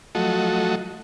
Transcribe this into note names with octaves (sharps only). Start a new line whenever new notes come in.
F3 F#3 A3 F#4 A4 D#5